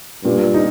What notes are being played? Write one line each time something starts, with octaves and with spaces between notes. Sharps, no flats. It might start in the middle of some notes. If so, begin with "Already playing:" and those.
G2 A#2
D#4